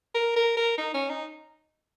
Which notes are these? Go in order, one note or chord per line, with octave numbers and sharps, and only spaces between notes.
A#4
A#4
A#4
D#4
C#4
D#4